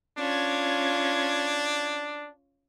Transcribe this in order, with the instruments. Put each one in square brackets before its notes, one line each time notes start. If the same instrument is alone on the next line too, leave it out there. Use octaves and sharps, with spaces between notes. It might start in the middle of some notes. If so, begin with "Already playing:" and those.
[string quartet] C#4 F4 G#6 [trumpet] D4